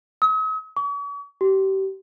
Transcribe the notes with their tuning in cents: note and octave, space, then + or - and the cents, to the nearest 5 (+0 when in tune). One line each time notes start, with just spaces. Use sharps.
D#6 +45
C#6 +45
G4 -30